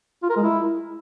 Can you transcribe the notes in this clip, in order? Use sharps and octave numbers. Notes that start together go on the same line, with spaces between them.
F4
A#4
G#3
E4